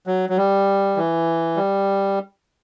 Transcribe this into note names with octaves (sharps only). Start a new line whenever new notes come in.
F#3
F#3
G3
E3
G3